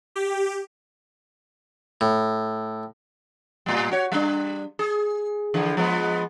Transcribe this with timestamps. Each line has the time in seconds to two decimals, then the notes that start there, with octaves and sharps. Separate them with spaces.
0.16 G4
2.01 A2
3.66 A2 G3
3.92 F#4 C#5
4.12 G3 D4
4.79 G#4
5.54 D3 E3 F3
5.77 F3 G#3 B3